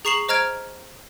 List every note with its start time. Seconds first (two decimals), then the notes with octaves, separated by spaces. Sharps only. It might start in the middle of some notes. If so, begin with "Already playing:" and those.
0.05 G#4 A#5 C#6 C7 E7 F#7
0.28 C5 D#5 A#5 F6 G#6 D7